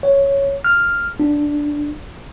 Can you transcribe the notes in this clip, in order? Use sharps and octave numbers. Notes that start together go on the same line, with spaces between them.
C#5
F6
D4